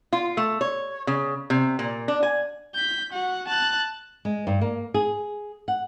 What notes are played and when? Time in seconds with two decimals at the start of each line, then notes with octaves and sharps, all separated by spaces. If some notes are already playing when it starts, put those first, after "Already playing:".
0.13 F4
0.37 A3
0.61 C#5
1.07 C#3
1.50 C3
1.79 A#2
2.08 D4
2.23 G#5
2.75 G6 B6
3.12 F#4 F#5
3.48 A5 F#6
4.25 G#3
4.47 G2
4.61 A#3
4.94 G#4
5.68 F#5